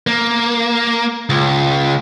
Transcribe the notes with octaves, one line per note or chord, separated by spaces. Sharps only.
A#3
C#2